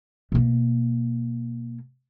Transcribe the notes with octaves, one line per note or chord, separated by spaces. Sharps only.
B2 A#3